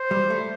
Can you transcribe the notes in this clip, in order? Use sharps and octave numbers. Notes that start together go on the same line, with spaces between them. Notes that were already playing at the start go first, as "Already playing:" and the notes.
Already playing: C5
G3
A3